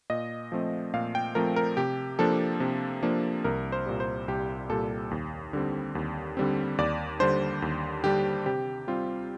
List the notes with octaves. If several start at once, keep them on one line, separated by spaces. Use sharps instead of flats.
A#2 D#5
F3 A3 C4
A#2 F5
G5
F3 A3 C4 A#4
A#4
C3 G4
F3 A#3 D4 A4
C3
F3 A#3 D4
C2 A#4
C5
A#2 G3
C5
C2 G4
A#2 G3 A4
D#2
D3 G3 C4
D#2
D3 G3 C4
D#2 D5
D3 G3 D4 C5
D#2
D3 G3 D4 G4
C3 G4
G3 C4 F4